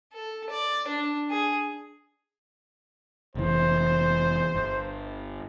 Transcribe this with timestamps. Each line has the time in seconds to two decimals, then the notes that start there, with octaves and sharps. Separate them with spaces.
0.14 A4
0.50 D5
0.88 D4
1.30 G#4
3.35 F1 E3 C5
4.55 G1